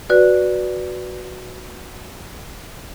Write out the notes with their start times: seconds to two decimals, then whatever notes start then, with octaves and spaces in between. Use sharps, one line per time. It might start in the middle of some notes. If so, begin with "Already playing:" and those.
0.10 F#4 B4 D5